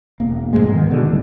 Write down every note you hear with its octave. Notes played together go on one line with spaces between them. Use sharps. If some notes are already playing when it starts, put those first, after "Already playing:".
E1 A#3
F1 F2 G#2 G#3
D#3 G#3 B3
B2 D3 D#3
D#1 C#2 A2 G3